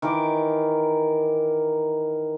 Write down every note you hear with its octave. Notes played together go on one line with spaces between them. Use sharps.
D#3 E3 A#4 D6